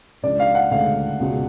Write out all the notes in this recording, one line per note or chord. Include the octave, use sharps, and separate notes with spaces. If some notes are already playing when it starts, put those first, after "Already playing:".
C#2 C#3 F3 G#3 D4 D5
F5
F#5
D2 C#3 G#3 F5
C#2 B2 G#3